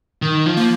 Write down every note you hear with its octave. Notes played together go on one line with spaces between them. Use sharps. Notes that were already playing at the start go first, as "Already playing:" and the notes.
D#3
F3
A#3